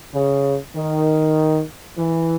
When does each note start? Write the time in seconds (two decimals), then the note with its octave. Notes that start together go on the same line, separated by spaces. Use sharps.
0.14 C#3
0.75 D#3
1.98 E3